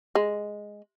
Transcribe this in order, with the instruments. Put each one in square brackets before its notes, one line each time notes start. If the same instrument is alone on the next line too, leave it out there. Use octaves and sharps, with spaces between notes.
[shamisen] G#3